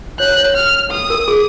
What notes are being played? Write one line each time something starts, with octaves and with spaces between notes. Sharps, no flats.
C#5 F#6
C#5
F6
D#6
A#4
G#4